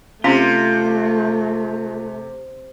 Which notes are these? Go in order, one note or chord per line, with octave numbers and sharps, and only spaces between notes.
C3 A3 C4 C#4 F4